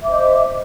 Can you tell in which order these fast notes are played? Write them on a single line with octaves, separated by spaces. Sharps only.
E5 D6 C5 D#5